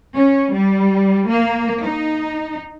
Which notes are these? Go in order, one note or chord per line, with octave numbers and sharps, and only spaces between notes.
C#4
G3
A#3
D#4